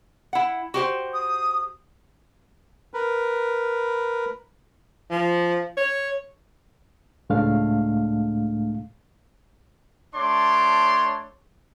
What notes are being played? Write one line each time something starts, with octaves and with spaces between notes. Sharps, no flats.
E4 F#5
F#4 G4 C5
D#6
A#4 B4
F3
C#5
C#2 A2 G#3 A3 D4 F5
A3 D4 C#5 C6 D6